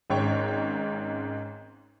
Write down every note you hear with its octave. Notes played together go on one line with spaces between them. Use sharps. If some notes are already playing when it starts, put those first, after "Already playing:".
G#1 G#2 C#4 C#5 G5